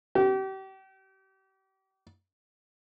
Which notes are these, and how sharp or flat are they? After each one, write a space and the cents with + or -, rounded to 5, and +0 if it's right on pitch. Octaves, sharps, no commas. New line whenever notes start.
G4 -35